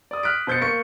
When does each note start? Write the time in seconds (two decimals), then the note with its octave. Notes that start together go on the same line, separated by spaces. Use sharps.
0.11 D5 D#6
0.23 F6 F#6 B6 D7
0.47 B2 C5 G6 A6 C#7
0.61 A#3 C#6 C#7